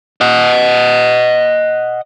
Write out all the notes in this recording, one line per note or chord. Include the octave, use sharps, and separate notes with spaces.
D#5 F#5